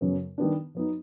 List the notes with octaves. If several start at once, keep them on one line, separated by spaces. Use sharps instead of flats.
F#2 C#3 F#3 B3
D#3 G3 B3 D4
F#3 B3 D#4